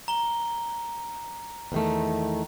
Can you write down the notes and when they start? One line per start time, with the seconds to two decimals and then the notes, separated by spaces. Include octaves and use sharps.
0.08 A#5 G7
1.72 E2 D#3 A3